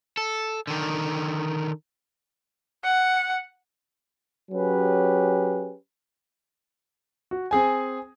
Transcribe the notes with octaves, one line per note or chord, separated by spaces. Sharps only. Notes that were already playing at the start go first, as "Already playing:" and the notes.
A4
D3 D#3
F#5
F#3 C#4 G4 G#4 B4
F#4
C4 G#4 G#5